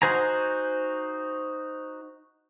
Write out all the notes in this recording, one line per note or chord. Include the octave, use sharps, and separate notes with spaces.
D#4 F#4 C5 G#5 A#5